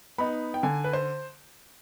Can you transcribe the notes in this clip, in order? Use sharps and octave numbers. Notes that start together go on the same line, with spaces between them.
B3 D#4 B5
G5
D3 G#5
B4
C5